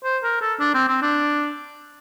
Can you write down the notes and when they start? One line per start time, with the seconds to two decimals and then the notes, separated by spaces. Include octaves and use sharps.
0.04 C5
0.24 A#4
0.41 A4
0.60 D4
0.75 C4
0.88 C4
1.02 D4